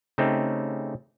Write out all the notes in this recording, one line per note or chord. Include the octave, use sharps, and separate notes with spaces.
C#3 A3 C4 C#4 D#4 G4